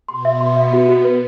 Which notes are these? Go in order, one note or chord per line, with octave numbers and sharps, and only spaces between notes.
B2 B3 C6
E5
C6
E5
F#4
F#4
B4